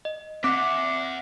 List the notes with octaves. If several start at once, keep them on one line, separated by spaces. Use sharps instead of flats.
D#5
C4 E5 F#5 D6 F#6 B6